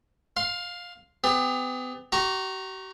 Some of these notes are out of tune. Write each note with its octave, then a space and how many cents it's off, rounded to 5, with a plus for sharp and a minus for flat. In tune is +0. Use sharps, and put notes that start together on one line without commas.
F5 +15 C6 +0
B3 +40 G4 +40
G4 -45 A#5 +0 C#6 -20